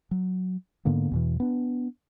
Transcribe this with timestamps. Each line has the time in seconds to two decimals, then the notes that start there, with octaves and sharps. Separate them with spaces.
0.11 F#3
0.85 G#2 D3 A#3 B3
1.11 E2 B2 E3
1.40 B3 D4